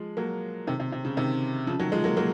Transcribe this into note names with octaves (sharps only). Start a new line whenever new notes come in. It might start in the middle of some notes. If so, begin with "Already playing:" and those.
Already playing: F3 G#3
F#3 A#3
C3 D#3
C3
C3
C#3
C3 D#3
C#3 F3
D#3 F#3
F3 G#3
F#3 A#3
F#3 A#3